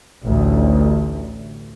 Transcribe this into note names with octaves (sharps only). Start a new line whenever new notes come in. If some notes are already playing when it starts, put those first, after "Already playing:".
A1 D2